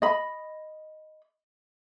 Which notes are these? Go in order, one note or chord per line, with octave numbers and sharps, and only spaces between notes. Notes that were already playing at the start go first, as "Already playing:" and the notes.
D#5 B5